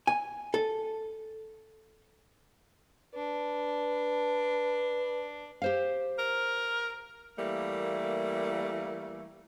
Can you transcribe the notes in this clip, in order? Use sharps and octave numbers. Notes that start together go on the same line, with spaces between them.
G#5
A4
D4 B4
G4 C5 F5
A#4
E3 G3 A3 A#3